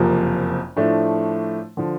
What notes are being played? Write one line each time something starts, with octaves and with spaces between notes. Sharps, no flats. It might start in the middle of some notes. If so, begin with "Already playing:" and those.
Already playing: F#1 F2 C3 F3 A#3
A2 F3 A3 D4
D3 F3